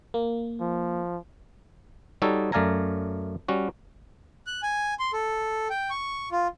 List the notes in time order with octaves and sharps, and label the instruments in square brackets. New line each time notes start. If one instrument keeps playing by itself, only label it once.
[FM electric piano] A#3
[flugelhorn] F3
[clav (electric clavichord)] G3 D#4 F#4 A4 C#5
F#2 A3 D5 F5 G#5 A#5
G3 C#4 F#4
[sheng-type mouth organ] F#6
G#5
C6
A4
G5
C#6
F4